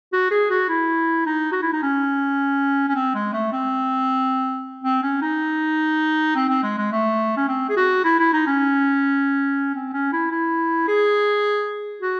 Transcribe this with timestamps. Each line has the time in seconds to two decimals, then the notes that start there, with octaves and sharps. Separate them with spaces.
0.13 F#4
0.31 G#4
0.50 F#4
0.69 E4
1.26 D#4
1.52 F#4
1.62 E4
1.73 D#4
1.82 C#4
2.88 C#4
2.95 C4
3.15 G#3
3.33 A3
3.52 C4
4.84 C4
5.03 C#4
5.22 D#4
6.35 C4
6.49 C4
6.63 G#3
6.78 G#3
6.92 A3
7.37 C#4
7.48 C4
7.69 G#4
7.77 F#4
8.04 E4
8.19 E4
8.33 D#4
8.47 C#4
9.75 C4
9.93 C#4
10.12 E4
10.31 E4
10.88 G#4
12.01 F#4